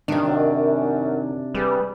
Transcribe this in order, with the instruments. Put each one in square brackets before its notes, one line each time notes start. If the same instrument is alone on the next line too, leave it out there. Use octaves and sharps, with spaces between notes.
[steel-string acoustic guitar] C3 D4 [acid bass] D#3
[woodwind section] F#2
[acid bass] G3 [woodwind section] G#4 B4